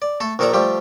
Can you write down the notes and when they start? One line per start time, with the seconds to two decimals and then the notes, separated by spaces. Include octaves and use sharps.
0.02 D5
0.20 A3 A4
0.39 A#1 D#3 A4 A#4 D5 A#5
0.53 F3 G3 A3 G4